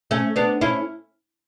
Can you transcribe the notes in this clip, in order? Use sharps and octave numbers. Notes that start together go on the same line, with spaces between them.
A3 C#4
B3 D4
C#4 E4